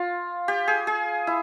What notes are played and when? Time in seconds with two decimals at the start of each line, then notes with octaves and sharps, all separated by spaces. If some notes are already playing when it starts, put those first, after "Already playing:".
Already playing: F4
0.48 G4
0.68 G#4
0.87 G#4
1.27 E4